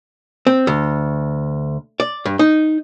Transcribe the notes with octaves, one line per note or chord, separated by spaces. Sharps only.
C4
D2
D5
G2
D#4